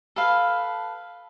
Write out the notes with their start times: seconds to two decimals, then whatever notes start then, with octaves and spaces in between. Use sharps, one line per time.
0.16 A4 B4 F5